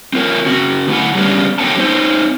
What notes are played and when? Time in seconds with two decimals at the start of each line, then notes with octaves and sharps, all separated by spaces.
0.13 C4 F4 A#4 C#5
0.46 C#3 C#4 F#4
0.88 D3 A3 E4 F#5
1.15 C#3 G3 B3 C#4 D4
1.58 D3 F#3 B3 C#5 G5 A5
1.78 C4 D#4 C5 C#5